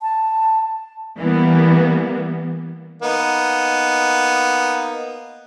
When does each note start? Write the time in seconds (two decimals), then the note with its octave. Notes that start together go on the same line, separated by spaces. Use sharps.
0.01 A5
1.18 E3 G3 A#3 B3
3.02 A#3 B3 D#4